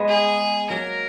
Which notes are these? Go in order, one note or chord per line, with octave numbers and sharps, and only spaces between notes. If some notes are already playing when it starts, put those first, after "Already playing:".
Already playing: G#3 B3
G#4
F#3 A#3 A#4